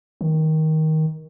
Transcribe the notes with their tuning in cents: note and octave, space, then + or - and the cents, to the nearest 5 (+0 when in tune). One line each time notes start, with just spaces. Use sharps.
D#3 +15